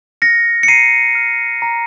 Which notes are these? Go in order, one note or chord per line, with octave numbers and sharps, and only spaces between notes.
F6 A#6 C#7
C#7
A#5 C7 D#7
F6
A#5